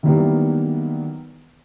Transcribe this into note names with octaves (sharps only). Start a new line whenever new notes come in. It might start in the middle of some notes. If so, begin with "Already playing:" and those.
D#3 E3 F#3 G3 A#3 B3